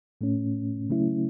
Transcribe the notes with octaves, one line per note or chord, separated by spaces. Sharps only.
A2 A3 C#4
C#3 F#3 A3 C#4 E4